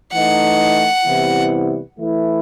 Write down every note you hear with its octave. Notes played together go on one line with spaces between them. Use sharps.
E3 A3 D#4 F#5
C3 E3 G3 B3 E4
E3 A3 E4